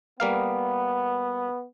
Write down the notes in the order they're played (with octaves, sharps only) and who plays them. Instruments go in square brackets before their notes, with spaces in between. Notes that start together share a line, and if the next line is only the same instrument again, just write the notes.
[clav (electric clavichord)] G3 A#3 F5 [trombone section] B3